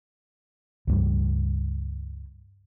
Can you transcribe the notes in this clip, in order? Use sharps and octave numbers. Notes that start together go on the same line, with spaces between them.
C#2 G2 G3